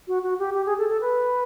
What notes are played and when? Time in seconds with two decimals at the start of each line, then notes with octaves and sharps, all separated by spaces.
0.08 F#4
0.23 F#4
0.39 G4
0.54 G4
0.66 G#4
0.78 A4
0.89 A4
1.01 B4